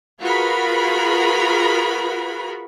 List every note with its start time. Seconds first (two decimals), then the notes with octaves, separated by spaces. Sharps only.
0.19 F4 F#4 G#4 A#4 B4 B5